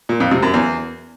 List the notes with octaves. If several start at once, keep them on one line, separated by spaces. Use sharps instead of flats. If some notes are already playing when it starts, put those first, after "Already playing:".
A#2
F2
C3
F#2
E2